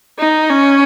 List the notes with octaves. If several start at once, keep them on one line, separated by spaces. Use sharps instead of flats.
D#4
C#4